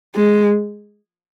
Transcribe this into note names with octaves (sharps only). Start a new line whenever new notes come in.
G#3